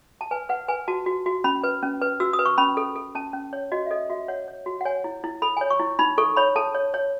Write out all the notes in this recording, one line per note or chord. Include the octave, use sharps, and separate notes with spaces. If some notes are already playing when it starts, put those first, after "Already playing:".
A5
B4 G#5
B4 F#5
B4 G#5
F#4 A5
F#4
F#4
C#4 B5
B4
C#4
B4
F#4 E6
D#6
B4
C#6
C#4 B5
A4
A4
C#4 A5
C#4
C#5
F#4 D#5
E5
A4 D#5
F#4 E5
C#5 F#5
C#5
F#4
F#5
C#5 G#5
E4
E4
A4 B5
C#5 G#5
C#6
E4
D#4 B5
A4 C#6
C#5 B5
A4 A5
C#5
C#5